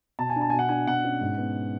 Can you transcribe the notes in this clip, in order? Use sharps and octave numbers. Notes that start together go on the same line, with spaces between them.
B2 A5
G#5
D4
A5
B2 G#5
F#5
D4 G#5
B2 F#5
C#4
G#2
B3